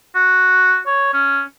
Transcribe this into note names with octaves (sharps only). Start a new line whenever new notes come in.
F#4
C#5
C#4